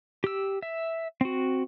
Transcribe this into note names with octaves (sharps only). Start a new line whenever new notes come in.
G4 E6
E5
C4 F#4